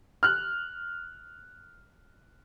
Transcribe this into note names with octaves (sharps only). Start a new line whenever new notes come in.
F6 F#6